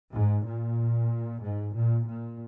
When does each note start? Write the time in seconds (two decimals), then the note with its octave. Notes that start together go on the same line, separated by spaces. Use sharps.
0.12 G#2
0.44 A#2
1.41 G#2
1.74 A#2
2.07 A#2